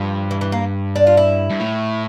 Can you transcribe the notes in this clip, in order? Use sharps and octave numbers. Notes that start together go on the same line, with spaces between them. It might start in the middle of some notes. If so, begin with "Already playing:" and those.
Already playing: G2 F3
E3
E3
A#3
D4
F4
E4
G2
A2